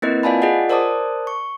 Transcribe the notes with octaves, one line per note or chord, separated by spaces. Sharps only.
A#3 C4 E4 A#4 B4 D#5
F4 D5 F5 G#5 A5 B5
F4 G#4 D5 D#5 F#5
A#4 C5 D5 A5 D6 D#6
C#6